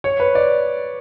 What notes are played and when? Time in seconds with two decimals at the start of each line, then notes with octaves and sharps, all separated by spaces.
0.04 C#5
0.20 B4
0.35 D5